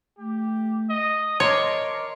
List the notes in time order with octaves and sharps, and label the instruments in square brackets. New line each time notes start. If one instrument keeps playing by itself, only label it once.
[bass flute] A3 [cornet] G4
[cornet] D#5
[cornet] A#4 [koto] C#5 [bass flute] D#5 [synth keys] A5 C6 D6